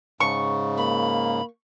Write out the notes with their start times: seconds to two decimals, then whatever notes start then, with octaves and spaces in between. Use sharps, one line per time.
0.20 G#2 C#3 C#6
0.77 A#3 B5